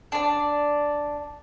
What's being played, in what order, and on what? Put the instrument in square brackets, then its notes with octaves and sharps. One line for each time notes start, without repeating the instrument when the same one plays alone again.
[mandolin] D4 D5